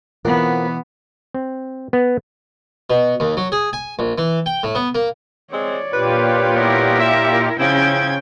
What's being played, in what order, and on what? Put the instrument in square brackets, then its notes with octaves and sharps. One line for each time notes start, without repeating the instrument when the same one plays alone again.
[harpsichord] B2 E3 [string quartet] B3 [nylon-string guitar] C4 F4 A#4
[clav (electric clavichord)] C4
B3
[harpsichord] B2
D#2
F#3
G#4
G#5
A#1
E3
G5
A2
B3
A#3
[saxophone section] G#3 C4 [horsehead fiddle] C#5 D5
[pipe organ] A#2 F4 G4 [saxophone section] D4 B4
[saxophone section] G3 B3 [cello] E4 A#4
[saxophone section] E5
[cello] C#3 G5 [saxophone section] F3 E4 [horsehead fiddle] C#4 [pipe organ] G#6